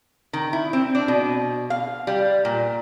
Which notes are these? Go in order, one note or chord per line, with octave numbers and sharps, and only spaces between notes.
D#3
E4
C4
D4
B2
F5
G3
A#2